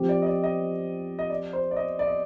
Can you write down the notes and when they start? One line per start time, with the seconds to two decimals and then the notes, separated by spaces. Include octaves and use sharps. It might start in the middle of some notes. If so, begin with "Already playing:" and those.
Already playing: F3 C4 G4
0.09 D5
0.22 D#5
0.26 D5
0.44 D#5
1.19 D#5
1.30 D5
1.53 C5
1.71 D5
1.76 D#5
1.99 D5
2.08 D#5